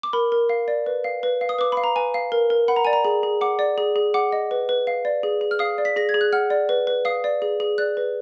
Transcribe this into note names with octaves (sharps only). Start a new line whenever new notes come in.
D6
A#4 B5
A#4
F5
D5
B4
F5
B4
F5
D#6
B4 D6
F5 B5
A#5
B4 G#5
F5
A#4
A#4
F#5 B5
A#5
D5 G#5
A#5
G#4
G#4
F#5 D6
D5
G#4
G#4
F#5 D6
D#5
B4
B4
F5
D5
G#4
G#4
F6
F5 D#6
D5
B6
G#4 A#6
G#6
G#4
F#6
F#5 F6
D5
B4
B4
F5 D#6
D5
G#4
G#4
D5 F#6
B4